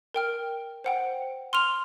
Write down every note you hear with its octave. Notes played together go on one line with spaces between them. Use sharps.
A#4 G5 F6
C5 F#5 G5
C6 F6 F7